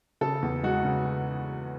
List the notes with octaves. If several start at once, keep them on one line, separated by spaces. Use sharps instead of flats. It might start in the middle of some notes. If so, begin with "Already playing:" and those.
C#3 A4
E2
G#3 F#4
C#3